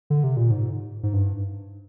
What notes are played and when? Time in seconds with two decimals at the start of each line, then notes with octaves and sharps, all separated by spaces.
0.10 D3
0.24 C3
0.37 A#2
0.50 G#2
1.03 G#2
1.13 G2